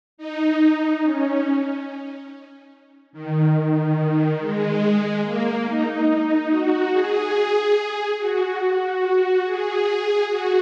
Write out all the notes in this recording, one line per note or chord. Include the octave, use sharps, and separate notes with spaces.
D#4
C#4
D#3
D#3
G#3
A#3
D#4
D#4
F#4
G#4
F#4
F#4
G#4
F#4